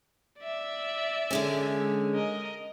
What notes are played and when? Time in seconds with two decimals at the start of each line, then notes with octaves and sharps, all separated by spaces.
0.40 D5 E5
1.31 D3 G#3 C#4
2.14 A#4 D#5